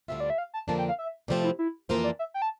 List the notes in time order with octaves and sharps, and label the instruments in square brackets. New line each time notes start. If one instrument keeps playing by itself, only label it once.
[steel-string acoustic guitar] D2 D3 G3 C4 F4 [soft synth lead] E5
[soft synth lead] D5
E5
F5
A5
[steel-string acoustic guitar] F2 D3 F3 A#3 D4 [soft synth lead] A5
[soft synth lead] G5
F5
E5
[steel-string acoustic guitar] C3 F3 A3 C4 [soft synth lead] D5
[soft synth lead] E4
E4
[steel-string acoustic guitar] F2 E3 A#3 F4 A4 [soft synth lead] C5
[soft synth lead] D5
E5
G5
A5